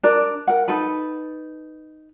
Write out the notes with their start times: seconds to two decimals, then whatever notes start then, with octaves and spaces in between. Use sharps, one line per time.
0.03 D4 A#4 D5
0.47 A#4 F#5
0.68 D#4 A4 B4 B5